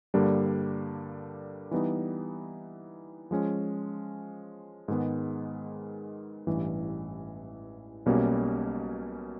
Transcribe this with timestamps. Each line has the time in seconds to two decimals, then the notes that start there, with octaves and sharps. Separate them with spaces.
0.14 G2 D3 G3 A#3 D4
1.71 E3 G3 B3 D#4
3.31 F3 G#3 C#4
4.88 G#2 D#3 G#3 B3
6.47 A1 G2 E3
8.06 B1 B2 G3 A#3 C#4